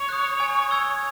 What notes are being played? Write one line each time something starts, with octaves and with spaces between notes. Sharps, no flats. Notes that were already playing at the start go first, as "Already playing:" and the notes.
Already playing: C#5
D#6 F#6
G#5
C#6 E6 G#6